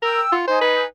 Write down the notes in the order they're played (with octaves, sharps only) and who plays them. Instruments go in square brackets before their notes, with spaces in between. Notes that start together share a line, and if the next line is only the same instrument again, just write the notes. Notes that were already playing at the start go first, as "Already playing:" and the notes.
[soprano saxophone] A#4 [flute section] G5 E6
[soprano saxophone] F4 [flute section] F#5
[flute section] D#4 G#5 [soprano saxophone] C5
[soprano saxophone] B4